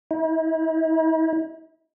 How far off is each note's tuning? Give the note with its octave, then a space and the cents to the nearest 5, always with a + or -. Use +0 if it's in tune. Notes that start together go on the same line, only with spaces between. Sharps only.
E4 -45